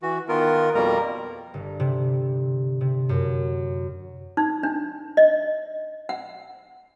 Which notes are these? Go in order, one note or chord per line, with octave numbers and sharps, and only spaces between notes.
E3 F#4
D#3 B3 F4 A#4
F2 B2 G3 A#3 A#4 A#5
G1
C3
C3
F#2
D#4
D4
D#5
F#5